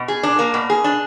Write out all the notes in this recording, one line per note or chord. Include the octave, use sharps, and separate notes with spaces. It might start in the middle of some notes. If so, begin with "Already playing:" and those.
Already playing: B2
G#4
D4
A#3
B2
G#4
D4